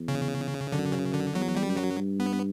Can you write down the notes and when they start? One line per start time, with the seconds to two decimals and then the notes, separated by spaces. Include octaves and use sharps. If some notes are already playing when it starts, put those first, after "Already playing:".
Already playing: E2
0.08 C#3
0.72 F#2 D3
0.92 C#3
1.14 D3
1.35 E2 F#3
1.56 G3
1.67 F#2
1.77 F#3
1.98 G2
2.20 B3